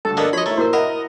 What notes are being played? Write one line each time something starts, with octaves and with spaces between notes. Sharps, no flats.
D2 G2 A4 A5
A#3 B3 D4 D#5
F3 F#4 C#5 D#5 B5
A3 E4 A#4 A#5
A#2 E4 F#4 A#4 C5
A#4 D#5 E5 F#5 B5